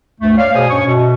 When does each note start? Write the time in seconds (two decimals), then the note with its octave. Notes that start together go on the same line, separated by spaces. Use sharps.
0.20 D2 G2 A3
0.37 C#5 D5 F5
0.54 B2 G#4 C5 G#5 D#6
0.69 G2 C#4 C#5 C#6
0.86 F#2 B2